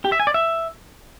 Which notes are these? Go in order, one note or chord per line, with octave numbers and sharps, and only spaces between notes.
G4
E5
G#5
D5
E5